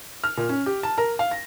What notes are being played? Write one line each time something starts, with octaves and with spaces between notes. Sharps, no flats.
F6
A#2
C#4
G4
A5
A#4
F5
A#6